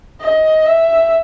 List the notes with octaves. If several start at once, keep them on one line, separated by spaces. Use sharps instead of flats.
D#5
E5